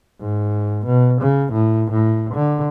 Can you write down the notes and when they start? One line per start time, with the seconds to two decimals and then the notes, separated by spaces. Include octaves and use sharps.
0.21 G#2
0.86 B2
1.21 C#3
1.53 A2
1.91 A2
2.34 D3